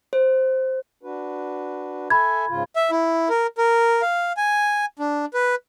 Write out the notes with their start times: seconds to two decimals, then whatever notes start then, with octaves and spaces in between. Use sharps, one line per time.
0.13 C5
1.03 D4 F#4 B4
2.10 A4 E5 G#5 B5 G#6
2.49 G#2 C#3 F4
2.75 E5
2.91 E4
3.29 A#4
3.58 A#4
4.02 F5
4.37 G#5
4.99 D4
5.34 B4